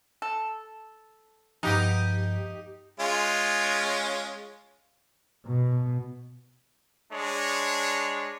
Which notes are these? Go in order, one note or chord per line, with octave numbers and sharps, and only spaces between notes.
A4
G2 F3 G#3 A#3 B3 D#4 G4
G#3 C#4 F4
B2
G#3 D4 C#5